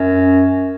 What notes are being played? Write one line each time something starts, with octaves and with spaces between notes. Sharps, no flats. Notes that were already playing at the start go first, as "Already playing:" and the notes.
Already playing: F#2